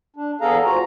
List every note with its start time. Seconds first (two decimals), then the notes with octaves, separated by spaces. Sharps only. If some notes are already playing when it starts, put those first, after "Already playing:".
0.16 D4
0.41 E2 B3 G#4 A4 F5 A#5
0.64 G#2 F4 F#4 A#5